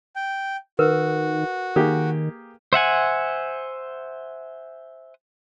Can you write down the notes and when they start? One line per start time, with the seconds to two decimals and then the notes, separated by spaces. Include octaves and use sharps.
0.16 G5
0.79 D#3 F#4 A#4 B4
1.76 D#3 A#3 G4 G#4
2.73 C5 E5 F#5 G#5